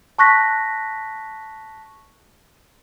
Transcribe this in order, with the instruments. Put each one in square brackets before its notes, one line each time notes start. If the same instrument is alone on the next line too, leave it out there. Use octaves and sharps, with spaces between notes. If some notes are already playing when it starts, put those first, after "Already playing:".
[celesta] A5 C#6 F#6 A#6 B6